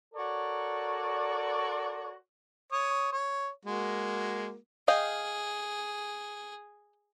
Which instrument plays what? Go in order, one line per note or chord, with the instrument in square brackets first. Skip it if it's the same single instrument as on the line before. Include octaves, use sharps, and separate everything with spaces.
[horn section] F#4 A4 A#4 C#5 D5
[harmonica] C#5 D#6
C#5
G#3 A#3 F#4
[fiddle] G#4 [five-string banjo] D#5 F5 G5